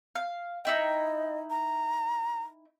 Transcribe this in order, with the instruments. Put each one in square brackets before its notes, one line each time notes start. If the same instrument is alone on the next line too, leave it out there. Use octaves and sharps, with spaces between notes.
[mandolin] F5
[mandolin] D#4 E4 G5 [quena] D#5
[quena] A#5